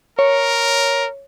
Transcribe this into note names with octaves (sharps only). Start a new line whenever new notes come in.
A#4 C#5